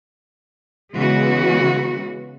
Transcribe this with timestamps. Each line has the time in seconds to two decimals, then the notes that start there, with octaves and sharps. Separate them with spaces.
0.96 C#3 E3 G#3 B3 F#4